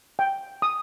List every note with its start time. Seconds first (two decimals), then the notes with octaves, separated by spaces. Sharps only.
0.19 G5
0.62 D#6